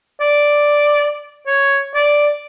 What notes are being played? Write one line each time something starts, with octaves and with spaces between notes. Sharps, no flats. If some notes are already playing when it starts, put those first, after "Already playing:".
D5
C#5
D5